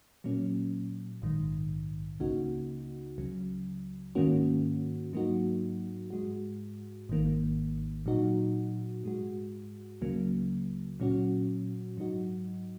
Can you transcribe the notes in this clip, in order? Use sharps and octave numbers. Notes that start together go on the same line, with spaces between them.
A#2 F#3 A#3 C#4
A#1 G#2 D#3
C#2 C#3 A#3 D#4 F#4
C#2 C#3 F#3
G#2 D#3 A#3 C#4 F#4
G#2 F#3 A#3 D#4 F#4
G#2 G#3 F#4
G#1 G#2 D#3 A#3
A#2 F#3 D#4 F#4
G#2 G#3 F#4
C#2 C#3 F#3 A#3
A#2 F#3 C#4 F#4
G#2 F#3 D#4 F#4